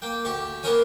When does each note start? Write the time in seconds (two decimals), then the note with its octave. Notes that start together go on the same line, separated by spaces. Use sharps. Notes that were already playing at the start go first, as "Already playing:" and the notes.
0.02 A#3 G5
0.25 D2 G4 C#6
0.63 A#3 B3 C#4 A#4 C#5 G#5